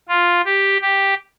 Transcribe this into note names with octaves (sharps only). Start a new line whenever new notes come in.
F4
G4
G4